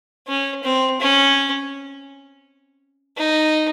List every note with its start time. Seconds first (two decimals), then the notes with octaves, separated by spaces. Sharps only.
0.28 C#4
0.63 C4
1.00 C#4
3.17 D#4